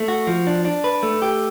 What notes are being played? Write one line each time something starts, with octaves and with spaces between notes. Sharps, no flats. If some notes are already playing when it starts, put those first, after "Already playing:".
Already playing: A3
F#4
F3
D4
D4
B4
A3
G4